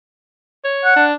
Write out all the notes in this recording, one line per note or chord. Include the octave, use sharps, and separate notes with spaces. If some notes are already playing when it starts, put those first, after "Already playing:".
C#5
F#5
D4